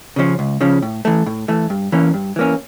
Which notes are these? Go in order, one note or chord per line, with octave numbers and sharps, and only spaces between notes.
C#3 F3 C#4
C#2
C#3 F3 C#4
A2
E3 A3
A2
E3 A3
G2
E3 A#3 C#4
G2
E3 A#3 C#4